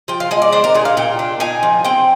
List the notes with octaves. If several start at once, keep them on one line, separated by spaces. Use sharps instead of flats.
F3 G5
F5
G#3 D#5
D5
D4 C5
A#4
A#2 G#4
F5
A#2 G5
D4
D#4 G#5
F3
C4 G5